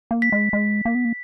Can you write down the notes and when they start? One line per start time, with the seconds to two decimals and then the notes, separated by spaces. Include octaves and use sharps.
0.11 A#3
0.22 B6
0.32 G#3
0.53 G#3
0.85 A#3
0.95 B3
1.05 A#3